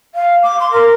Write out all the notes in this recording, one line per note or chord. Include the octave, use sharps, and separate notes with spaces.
F5
D6
C6
A#4